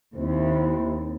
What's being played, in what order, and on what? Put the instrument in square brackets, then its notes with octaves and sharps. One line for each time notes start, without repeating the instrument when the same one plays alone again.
[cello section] D#2 [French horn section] C4 E4